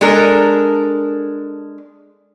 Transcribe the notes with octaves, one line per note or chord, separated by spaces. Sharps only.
G#3 D4 A4 A#4